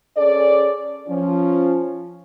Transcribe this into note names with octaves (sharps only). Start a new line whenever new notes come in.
C#4 G#4 A4 D5
F3 C#4